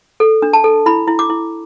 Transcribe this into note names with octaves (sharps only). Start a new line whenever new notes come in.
A4
D4
A5
A4
E4 B5
E4
D6
E4